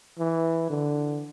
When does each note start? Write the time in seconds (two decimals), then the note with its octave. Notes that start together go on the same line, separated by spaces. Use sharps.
0.19 E3
0.70 D3